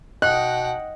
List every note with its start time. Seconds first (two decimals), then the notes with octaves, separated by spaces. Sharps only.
0.22 B2 D#5 F#5 G5 F#6